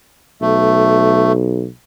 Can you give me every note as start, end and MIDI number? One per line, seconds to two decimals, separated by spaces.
0.41 1.66 35
0.41 1.32 57